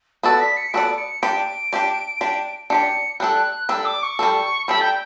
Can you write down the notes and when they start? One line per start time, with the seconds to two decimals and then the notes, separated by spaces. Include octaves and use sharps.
0.23 B3 F#4 A4 D5 A6
0.40 B6
0.57 C#7
0.73 B3 F#4 A4 D5 D7
0.98 C#7
1.22 D4 G4 D5 D7
1.73 D4 G4 D5
2.21 D4 G4 D5
2.70 D4 G4 D5 C#7
3.20 G3 D4 A4 F#6
3.69 G3 D4 A4 E6
3.85 D6
4.03 C#6
4.19 G3 D4 A4
4.68 G3 D4 A4 B5
4.81 G5